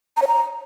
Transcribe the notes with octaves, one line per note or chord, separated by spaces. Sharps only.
A#5
C#5
A#5